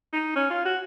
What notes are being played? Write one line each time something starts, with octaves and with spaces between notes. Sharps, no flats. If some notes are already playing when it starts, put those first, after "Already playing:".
D#4
C#4
F4
F#4